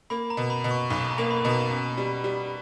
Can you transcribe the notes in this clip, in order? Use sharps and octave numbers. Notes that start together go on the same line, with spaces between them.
A#3 B5
A#5
B2
B5
B2
C#6
B1 B5
A#5
A#3
B5
B2
A#5
C#4
G3
G3